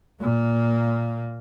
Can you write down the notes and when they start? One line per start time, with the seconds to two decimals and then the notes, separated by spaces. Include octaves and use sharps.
0.22 A#2 A#3